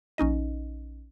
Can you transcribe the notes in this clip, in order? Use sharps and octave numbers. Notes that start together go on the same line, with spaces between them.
A#1 C#4 D#4 D#5